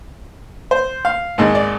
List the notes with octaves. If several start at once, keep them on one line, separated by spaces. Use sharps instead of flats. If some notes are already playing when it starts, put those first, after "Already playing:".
C5
F5
G#1 G#2 D#3 G#3 D#5
D5